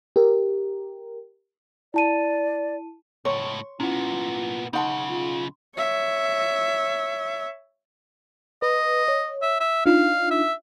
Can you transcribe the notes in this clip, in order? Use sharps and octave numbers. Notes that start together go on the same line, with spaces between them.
G4 A#4
E4 D5 A5 D#7
C#2 A2 C#5 C6
A#2 B3 C#4 E4 F4
B1 C#3 D#4 F#5 A5 B5 C6
F4
C#5 E5
B4 D#5
C#5
E5
E5
D4 D#4 F4 F5
E5